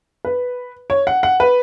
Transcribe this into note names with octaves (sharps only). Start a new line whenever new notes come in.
B4
C#5
F#5
F#5
B4